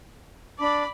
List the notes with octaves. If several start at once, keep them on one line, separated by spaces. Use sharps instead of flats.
D4 D5 A5 B5 D6